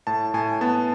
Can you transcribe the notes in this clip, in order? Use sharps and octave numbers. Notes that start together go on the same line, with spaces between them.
A2 A5
A2 G#5
B3 A5